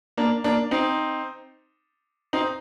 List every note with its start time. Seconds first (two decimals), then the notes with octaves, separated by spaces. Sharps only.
0.17 A#3 D4
0.44 A#3 D4
0.71 C4 D#4
2.33 C4 D#4